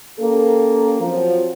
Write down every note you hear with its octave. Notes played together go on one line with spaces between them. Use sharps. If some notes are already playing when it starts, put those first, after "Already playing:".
A#3 C#4 G4 A4 A#4
F3 F#3 C4